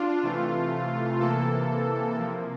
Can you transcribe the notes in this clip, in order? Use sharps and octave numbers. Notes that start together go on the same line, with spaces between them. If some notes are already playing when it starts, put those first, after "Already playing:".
Already playing: D4 F4
C3 E3 A3
C3 E3 A#3 A4
C3 F3 A#3